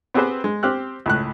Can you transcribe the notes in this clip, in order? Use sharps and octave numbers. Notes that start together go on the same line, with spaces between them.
B3 C4 G4 G#4 B4 C5
G#3
C4 G4 F6 F#6
C#2 A2 F#6